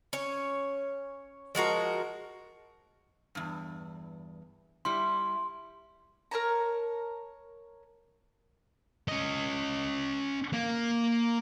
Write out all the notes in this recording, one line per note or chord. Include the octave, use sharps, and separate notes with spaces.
C#4 C#5
F3 G#3 F#4 A#4
E2 G2
G3 E4 C6
A#4 C#5 A5 A#5
C#4 D#5
A#3